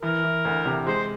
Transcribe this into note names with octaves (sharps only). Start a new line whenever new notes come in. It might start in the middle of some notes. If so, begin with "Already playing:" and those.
E3 A#4
E3
D2
C3
G#3 C5